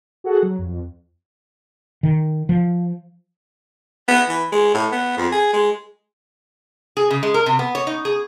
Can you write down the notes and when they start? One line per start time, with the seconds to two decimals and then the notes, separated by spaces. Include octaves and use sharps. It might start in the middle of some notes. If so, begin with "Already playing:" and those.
0.24 F#4 G#4 A4 F#5
0.42 F#3
0.59 F2
2.03 D#3
2.49 F3
4.08 B3
4.29 E3
4.52 G#3
4.74 A2
4.92 B3
5.17 F2
5.32 G#4
5.53 G#3
6.97 G#4
7.11 C#3
7.23 G#3
7.34 A#4
7.46 C3
7.59 B3
7.75 C#5
7.87 D#4
8.05 G#4